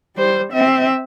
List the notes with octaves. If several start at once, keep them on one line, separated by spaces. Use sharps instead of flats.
G3 C5
C4 E5